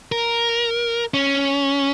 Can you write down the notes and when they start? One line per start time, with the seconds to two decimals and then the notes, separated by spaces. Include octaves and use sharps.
0.12 A#4
1.14 C#4